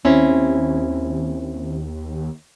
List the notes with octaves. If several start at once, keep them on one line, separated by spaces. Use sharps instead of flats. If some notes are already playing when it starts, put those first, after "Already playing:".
D#2 C4 C#4 E4